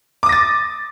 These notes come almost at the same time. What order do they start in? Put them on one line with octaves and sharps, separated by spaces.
D6 D#6 A#6 A6